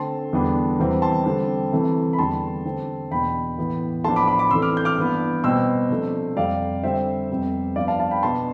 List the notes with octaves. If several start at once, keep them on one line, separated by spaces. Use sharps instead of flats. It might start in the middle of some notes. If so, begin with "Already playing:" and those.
Already playing: D3 A3 C4 A5 C6
E2 D3 G3 B3 D4
E2 C3 E3 G3 C4
A5 C6
D3 G3 C4
C3 E3 A3
B5
E2 D3 G3 D4 A5 C6
D3 A3 C4
E2 B2 B3 D4 G5 B5
A2 E3 B3
A2 F3 B3 D4 A5 C6
B5 D6
B5 D6
B5 D6
C3 E3 A3 D4 C6 E6
D6 F6
G6
D6 F6
G2 E3 B3 D4
B2 G3 C4 C6 E6
C3 F3 A3 D4
F2 C3 G3 D5 F5
D3 G3 C4 C5 E5
F2 C3 G3 B3
G2 F3 B3 D5 F5
F5 A5
F5 A5
G5 B5
B2 B3 D4 A5 C6